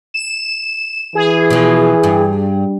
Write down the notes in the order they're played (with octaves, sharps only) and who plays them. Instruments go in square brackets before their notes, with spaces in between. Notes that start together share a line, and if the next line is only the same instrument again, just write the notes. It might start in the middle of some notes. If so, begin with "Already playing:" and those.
[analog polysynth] E7
[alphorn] E3 [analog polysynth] G#4
[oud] B2 F3
G2